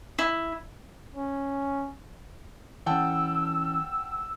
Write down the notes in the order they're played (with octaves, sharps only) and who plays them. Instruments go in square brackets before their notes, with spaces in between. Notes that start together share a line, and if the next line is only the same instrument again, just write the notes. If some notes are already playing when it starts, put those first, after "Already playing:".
[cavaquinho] E4
[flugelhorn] C#4
[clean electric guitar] E3 C#4 [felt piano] F#5 G5 A5 [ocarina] E6